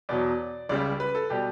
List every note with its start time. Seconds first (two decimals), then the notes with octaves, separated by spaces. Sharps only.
0.09 E2 B2 F#3 D5
0.69 C#2 C#3 G3 D5
1.00 B4
1.15 A4
1.30 B2 G3 G4